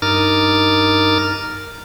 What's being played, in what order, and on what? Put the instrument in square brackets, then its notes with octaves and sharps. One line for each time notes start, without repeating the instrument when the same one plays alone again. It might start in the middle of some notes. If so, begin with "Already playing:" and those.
[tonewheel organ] G2 D#4 A#4 D6 F6 A6